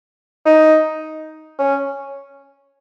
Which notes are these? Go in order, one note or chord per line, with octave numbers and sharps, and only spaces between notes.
D#4
C#4